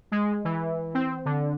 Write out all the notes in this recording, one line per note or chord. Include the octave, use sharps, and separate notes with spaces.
G#3
E3
C4
D3